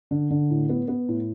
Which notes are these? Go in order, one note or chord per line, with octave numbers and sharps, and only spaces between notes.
D3
D3
A2
B3
B3
A2